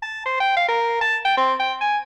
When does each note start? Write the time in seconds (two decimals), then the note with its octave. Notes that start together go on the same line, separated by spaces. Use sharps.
0.02 A5
0.25 C5
0.40 G5
0.57 F5
0.68 A#4
1.01 A5
1.25 G5
1.37 C4
1.60 G5
1.81 G#5